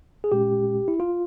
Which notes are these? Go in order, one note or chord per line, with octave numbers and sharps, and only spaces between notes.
G#4
A#2 G#3 C#4 G4
E4
F4